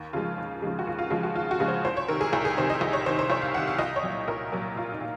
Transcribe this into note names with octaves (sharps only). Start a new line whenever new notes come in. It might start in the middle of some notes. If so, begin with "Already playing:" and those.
Already playing: D#2
C#3 F3 G#3 F4
D#2
C#3 F3 G#3
F#4
D#2 F4
F4
C#3 F3 G#3 F4
F#4
D#2 F4
F#4
C#3 F3 G#3
C5
C2 C5
C#5
C3 D#3 A#4
G#4
C2 G#4
G#4
C3 D#3 C5
D#5
C2
C#5
C3 D#3 C5
C5
C2 C#5
F5
C3 D#3 F#5
F5
C2 D#5
C#5
A#2 F#3
C2 A#4
A#2 F#3 A#4
C2 F4
D#4
A#2